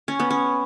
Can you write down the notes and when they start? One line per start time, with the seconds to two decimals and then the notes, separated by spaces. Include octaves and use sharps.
0.08 C#4
0.20 B3
0.31 C#4